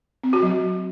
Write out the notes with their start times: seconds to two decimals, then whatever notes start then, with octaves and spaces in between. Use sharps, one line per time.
0.24 C4
0.33 F#4
0.42 F#3